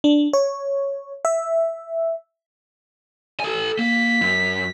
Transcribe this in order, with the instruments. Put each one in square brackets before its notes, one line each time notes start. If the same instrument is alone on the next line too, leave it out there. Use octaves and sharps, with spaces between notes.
[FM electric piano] D4
C#5
E5
[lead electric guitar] A4 G#5
[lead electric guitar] A#3 [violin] B6
[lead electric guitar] F#2